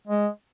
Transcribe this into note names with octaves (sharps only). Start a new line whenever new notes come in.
G#3